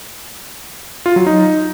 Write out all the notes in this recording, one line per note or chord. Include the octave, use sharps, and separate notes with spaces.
F4
F#3
D#4